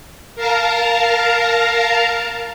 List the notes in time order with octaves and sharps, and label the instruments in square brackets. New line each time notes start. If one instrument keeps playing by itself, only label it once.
[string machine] A#4 F5 A5 A#5